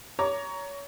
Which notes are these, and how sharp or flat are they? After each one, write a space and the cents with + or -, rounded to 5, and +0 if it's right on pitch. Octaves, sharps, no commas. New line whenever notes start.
C#5 +25 A#5 +0 D6 +0